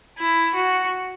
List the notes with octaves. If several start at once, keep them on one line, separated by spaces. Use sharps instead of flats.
E4
F#4